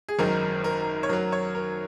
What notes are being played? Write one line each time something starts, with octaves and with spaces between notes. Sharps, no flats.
G#4
G#1 F#2 D#3 A#4
A#4
C#5
F#2 F#3 A#4
C#5
A#4